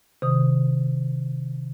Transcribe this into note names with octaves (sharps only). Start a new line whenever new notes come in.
C3 D#3 D#6